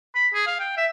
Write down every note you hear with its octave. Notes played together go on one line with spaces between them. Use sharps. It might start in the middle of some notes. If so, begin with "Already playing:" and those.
B5
G#4
F5
G5
E5